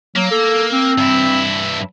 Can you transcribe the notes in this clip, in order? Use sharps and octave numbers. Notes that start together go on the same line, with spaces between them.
F#3 A#3
A4
C4
G2 E4